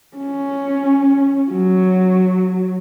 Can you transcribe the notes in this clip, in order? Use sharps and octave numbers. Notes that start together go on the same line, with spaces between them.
C#4
F#3